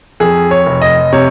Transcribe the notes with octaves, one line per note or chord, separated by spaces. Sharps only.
F2 G#4
C#5
F1
D#5
C3 C#5